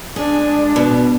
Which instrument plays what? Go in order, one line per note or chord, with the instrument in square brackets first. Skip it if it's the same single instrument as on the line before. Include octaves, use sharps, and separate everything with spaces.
[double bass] G#3 D4 [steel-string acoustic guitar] G#4
[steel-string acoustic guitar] B2